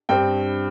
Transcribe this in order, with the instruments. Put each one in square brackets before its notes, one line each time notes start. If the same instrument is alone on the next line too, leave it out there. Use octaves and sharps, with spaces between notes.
[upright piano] G2 G3 C4 G5